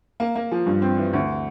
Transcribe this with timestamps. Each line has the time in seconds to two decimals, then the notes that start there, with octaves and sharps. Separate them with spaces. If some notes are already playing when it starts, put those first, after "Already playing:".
0.20 A#3
0.36 A#3
0.52 F3
0.66 G2
0.82 C4
0.97 E3
1.13 D2